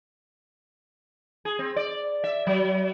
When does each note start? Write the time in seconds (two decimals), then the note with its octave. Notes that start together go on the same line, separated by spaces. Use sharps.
1.45 G#4
1.59 C4
1.76 D5
2.24 E5
2.47 F#3